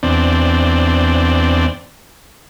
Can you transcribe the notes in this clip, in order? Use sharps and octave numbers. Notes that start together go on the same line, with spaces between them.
E2 C4 D4